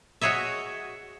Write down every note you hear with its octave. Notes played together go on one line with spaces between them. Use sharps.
F#4 G#4 C#5 D#5 E5